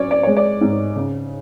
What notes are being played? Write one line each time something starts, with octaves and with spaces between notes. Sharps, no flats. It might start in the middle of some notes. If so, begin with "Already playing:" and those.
Already playing: F#3 C#4 C#5 D5
D5
G#3 C#5
D5
G#2
C#3